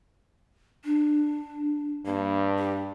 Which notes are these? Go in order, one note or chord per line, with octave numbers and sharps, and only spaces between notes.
D4
G2 A#3
G4